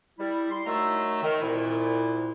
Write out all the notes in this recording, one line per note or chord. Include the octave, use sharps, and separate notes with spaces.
G3 E4
C6
D#3 F#3 A3 E5 A#5 E6
D#3
C2 A#2 E4